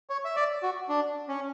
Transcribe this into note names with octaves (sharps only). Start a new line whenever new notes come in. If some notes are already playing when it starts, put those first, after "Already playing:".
C#5
E5
D5
F#4
D4
C#4